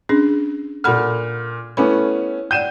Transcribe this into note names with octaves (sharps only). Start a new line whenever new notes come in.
C#4 D4 G#4
A#2 A4 F#5 B5 F6
A3 B3 C#4 E4 G#5 B5
D5 F#5 G5 G6 D#7 E7